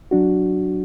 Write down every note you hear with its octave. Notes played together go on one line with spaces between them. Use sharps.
F#3 D4 F#4